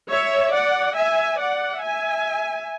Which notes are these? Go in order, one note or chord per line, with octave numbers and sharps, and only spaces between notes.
C#5 E5
D5 F#5
E5 G#5
D5 F#5
E5 G#5